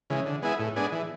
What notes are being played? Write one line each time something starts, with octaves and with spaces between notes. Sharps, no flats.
C#3 E3 G#3
D3
G#3 B3 E4 G#4
A2
G#3 B3 D4 G#4
E3